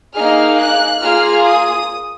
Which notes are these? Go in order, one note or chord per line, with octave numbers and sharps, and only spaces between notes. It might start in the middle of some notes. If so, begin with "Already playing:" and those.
A#3 D#4 G#4 F6
F#6
A#3 F4 G#4 F6
D#6